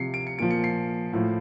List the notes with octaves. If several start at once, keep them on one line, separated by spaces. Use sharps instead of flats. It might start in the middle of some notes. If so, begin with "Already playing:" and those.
Already playing: C3 F3 C7 C#7
D7
C#7
A#2 F3 D7
C#7
C7
A2 F3